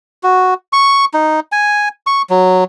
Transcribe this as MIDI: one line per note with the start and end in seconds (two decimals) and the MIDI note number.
0.23 0.54 66
0.73 1.05 85
1.14 1.40 63
1.52 1.89 80
2.07 2.22 85
2.30 2.64 54